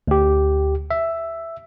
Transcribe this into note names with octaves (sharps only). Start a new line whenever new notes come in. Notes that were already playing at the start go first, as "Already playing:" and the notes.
D2 G4
E5